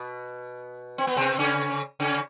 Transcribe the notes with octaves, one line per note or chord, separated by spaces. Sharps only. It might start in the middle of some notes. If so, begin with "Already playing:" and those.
Already playing: B2
C4
B3
C3 C4
C#3 C#4
C#3 C#4